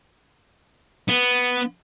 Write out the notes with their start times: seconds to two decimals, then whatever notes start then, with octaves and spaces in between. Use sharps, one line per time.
1.08 B3